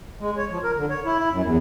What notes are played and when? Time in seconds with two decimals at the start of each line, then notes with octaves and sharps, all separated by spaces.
0.20 G#3
0.37 C#5
0.50 F3
0.64 A#4
0.76 D3
0.90 C#5
1.05 E4
1.19 E4
1.31 F#2
1.44 E2